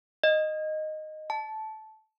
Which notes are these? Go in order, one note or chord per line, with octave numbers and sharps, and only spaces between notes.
D#5
A5